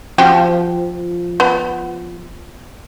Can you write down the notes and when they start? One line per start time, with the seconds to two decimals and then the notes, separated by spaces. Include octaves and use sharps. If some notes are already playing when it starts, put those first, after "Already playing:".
0.18 F3 C4 F#4 G4
1.40 B3